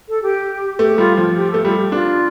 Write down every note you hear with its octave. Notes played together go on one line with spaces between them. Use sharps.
A4
G4
A3 G4
G3 F4
F3 F4
G4
A3 A4
G3 F4
G4
D4 F4